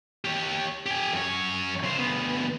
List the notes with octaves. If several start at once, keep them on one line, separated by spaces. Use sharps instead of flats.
G4 C#5
G4 G#5
F#2 C#5
C#3 C5
D2 B3